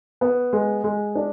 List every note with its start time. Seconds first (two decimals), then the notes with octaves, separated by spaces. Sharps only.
0.21 B3
0.53 G#3
0.84 G#3
1.15 D4